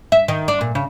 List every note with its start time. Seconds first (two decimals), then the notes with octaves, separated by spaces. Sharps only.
0.12 E5
0.28 D#3
0.48 D4
0.61 A#2
0.75 C#3